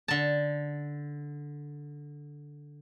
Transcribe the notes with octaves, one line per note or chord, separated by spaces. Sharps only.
D3 A5